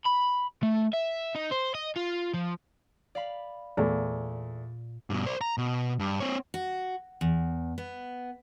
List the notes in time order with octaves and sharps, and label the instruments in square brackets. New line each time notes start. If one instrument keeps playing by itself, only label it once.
[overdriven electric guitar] B5
A3
E5
D#4
C5
D#5
F4
F3
[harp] D5 F5 B5
[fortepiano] E2 A3 [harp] A#2
[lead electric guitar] G2 B2
C5 D5
A#5
B2
G2
C4 C#5
[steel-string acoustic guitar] F#4
E2
B3